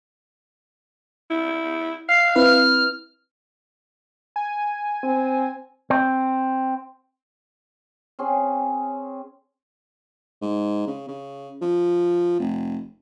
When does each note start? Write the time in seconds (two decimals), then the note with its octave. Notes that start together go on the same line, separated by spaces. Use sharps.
1.31 E4
2.09 F5 C7
2.36 C4 E4 B4 F6
4.36 G#5
5.04 C4
5.90 C4
8.19 C4 C#4 G#4
10.42 G#2
10.87 C#3
11.08 C#3
11.61 F3
12.39 F1